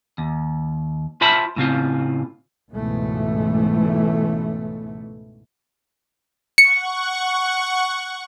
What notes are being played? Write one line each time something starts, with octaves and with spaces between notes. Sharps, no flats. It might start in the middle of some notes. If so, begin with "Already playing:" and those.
D#2
F4 C5 E5 A5 B5
A2 C#3 C4 F4
C#2 G#2 B2 E3 A3
F#5 C#6 C#7